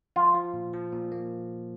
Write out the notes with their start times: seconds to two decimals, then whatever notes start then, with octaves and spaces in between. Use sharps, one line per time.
0.16 F3 F4
0.35 F3
0.54 A#2
0.74 F3
0.92 A#2
1.12 A#3